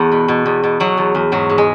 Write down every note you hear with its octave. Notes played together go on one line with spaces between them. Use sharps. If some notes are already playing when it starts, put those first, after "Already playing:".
Already playing: E2 A3 B3
B2
B2
E2
B2
B2 F#3
E2
E2
G#2 F#3
G#2
G#3